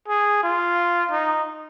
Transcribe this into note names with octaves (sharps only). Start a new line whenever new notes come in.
G#4
F4
D#4